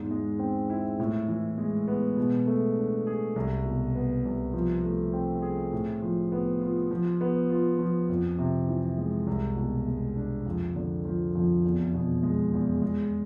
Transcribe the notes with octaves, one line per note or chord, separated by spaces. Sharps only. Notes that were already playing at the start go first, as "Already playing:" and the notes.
Already playing: E2 G#2
G#3
C4
E4
A2
E3
G#3
B3
B2
A3
D4
G#4
C2
B2
B3
C2
F3
A3
C4
G#4
A2
F3
B3
F4
F3
B3
F4
F3
F2
C3
E3
G#3
C2
B2
G#3
D4
F2
D3
F3
F2
E2
B2
G#3
E2
G#3